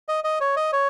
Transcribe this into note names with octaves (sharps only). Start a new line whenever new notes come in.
D#5
D#5
C#5
D#5
C#5